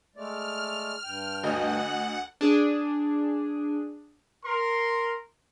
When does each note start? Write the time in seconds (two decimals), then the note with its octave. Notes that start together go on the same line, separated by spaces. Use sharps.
0.16 G#3 A3 D5 F6
1.04 G2 G5
1.43 D2 D#5 F#5
2.41 D4 G#4
4.44 A#4 C6